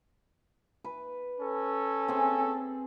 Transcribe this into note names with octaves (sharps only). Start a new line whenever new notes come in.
B4
C#4 A4
C4 G#4